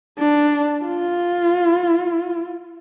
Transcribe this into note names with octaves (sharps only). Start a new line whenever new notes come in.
D4
F4